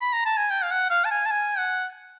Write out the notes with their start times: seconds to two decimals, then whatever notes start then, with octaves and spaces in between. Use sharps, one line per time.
0.01 B5
0.13 A#5
0.26 A5
0.37 G#5
0.50 G5
0.63 F5
0.71 F#5
0.90 F5
1.05 A5
1.11 G#5
1.26 A5
1.31 G#5
1.58 F#5